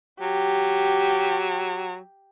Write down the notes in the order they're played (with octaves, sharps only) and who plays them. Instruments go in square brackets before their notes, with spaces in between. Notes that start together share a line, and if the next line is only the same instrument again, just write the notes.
[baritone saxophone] F#3 [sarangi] G4